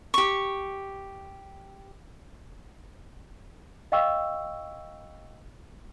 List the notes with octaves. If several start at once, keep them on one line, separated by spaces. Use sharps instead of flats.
G4 C#6
D#5 F5 G5 C#6 E6